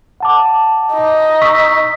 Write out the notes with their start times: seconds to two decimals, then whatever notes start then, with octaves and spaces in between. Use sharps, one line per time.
0.20 F#5 A5 D6
0.93 D#4
1.42 C#6 E6 B6